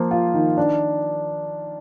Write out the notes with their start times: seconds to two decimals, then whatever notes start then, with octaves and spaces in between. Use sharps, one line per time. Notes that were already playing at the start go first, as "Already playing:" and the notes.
Already playing: F3 A#3 C5
0.11 F4
0.34 D#3
0.57 D4